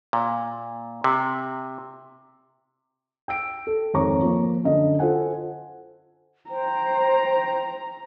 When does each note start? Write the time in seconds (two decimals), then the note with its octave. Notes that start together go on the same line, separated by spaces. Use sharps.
0.13 A#2
1.04 C3
3.28 G5 E6 D7
3.67 A4
3.94 G#1 F2 C#5 A#5 C#6 D6
4.22 F3 A#3
4.63 F#2 D3 D#5
4.99 F4 A4 C5 F#5 G#5
6.50 C5 G5 A#5